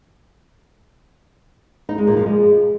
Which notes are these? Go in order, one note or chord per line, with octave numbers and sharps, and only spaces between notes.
D#4
G#3
A#2
F3
G#3